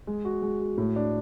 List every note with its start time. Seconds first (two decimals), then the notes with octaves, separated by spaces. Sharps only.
0.07 G#3
0.25 F#4
0.42 G#3
0.60 F#4
0.78 A2
0.96 D4